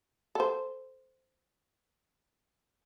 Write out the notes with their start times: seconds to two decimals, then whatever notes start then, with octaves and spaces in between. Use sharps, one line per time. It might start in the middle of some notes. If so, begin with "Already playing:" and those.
0.35 A4 C5